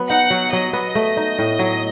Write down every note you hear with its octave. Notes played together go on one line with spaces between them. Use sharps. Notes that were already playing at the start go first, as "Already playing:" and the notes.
Already playing: F#3 B3
D#4 F#5
F#3
F#3 D#5
B3
A3
D#4
A2
F#3